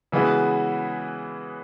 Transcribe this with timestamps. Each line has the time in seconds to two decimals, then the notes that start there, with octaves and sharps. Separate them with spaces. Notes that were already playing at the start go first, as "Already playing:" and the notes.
0.12 C#3 E3 G#3 B3 F#4